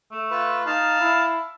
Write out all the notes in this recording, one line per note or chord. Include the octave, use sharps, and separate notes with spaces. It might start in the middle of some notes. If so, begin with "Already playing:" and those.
A3
F4 B4
D#4 F5 A5
E4